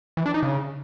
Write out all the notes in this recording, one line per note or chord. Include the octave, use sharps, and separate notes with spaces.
E3
D4
D#4
C#3